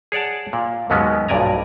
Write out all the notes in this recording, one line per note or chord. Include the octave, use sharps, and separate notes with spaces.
G#4 C#5 D5 F#5 A5
A#2
D#2 G#2 F#3 G#3 B3 C#4
B1 G2 A#2 D5 G#5 A#5